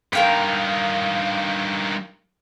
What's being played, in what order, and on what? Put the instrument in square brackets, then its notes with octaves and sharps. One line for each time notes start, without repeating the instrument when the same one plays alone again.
[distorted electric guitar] G2 D#3 [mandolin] A#4 F5 G5